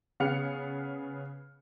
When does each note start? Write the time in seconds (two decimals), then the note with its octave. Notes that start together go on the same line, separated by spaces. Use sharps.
0.20 C#3 B3 G#4 F5 F6 C#7